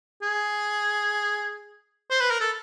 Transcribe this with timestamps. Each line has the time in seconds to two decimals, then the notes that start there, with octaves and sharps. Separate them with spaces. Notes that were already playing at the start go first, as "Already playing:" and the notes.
0.23 G#4
2.11 C5
2.20 B4
2.31 A#4
2.41 A4